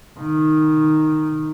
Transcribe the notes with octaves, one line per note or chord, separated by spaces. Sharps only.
D#3